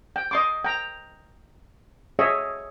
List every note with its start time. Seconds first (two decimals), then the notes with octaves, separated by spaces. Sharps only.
0.16 G5
0.31 D#5 C6 D6
0.64 G5 A#5
2.19 G#4 C#5 D#5 E5